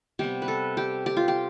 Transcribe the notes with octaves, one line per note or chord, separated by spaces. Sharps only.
C3 G3 B3 G4
B4
A4
G4
G4
F4
G4